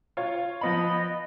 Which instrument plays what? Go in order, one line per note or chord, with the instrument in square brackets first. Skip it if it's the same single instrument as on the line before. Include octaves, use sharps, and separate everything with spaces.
[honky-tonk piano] F4 C#5
[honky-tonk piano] F3 B3 B5 [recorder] D#5